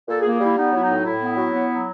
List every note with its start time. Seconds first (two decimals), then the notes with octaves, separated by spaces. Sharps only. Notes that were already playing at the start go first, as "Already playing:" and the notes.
0.08 A#2 A4
0.21 G#4
0.25 A#3
0.33 G#4
0.41 G3 E4
0.57 B3 D#4
0.73 F#3 E4
0.81 D#4
0.89 A2
1.04 A2 E4
1.21 B3
1.37 F#3
1.53 B3
1.70 F#3